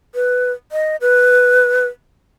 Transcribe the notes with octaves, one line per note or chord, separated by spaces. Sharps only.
B4
D#5
B4